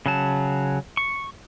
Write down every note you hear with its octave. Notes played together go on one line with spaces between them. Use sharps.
C#3 F#3 A5
C#6